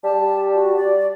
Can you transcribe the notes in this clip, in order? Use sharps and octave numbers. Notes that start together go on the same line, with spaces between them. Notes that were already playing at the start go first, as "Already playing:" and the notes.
G3 A5
F#4
D5